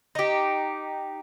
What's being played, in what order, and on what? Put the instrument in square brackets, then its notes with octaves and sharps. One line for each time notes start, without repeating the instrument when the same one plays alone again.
[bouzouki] D#4 G4